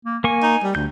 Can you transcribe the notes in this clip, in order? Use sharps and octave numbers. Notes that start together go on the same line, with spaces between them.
A#3
A#3 G#5 C#6
D#4
G3
D2 G6